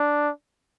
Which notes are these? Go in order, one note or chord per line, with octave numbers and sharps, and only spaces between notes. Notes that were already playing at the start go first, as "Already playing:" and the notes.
Already playing: D4